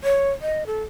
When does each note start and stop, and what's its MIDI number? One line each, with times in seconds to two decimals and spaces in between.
0.04 0.31 73
0.42 0.63 75
0.67 0.83 69